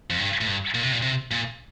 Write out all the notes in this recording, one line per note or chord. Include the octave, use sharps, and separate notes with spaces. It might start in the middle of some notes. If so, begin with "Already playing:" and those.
F2
G2
A2
G2
A#2
C3
A#2
C3
A#2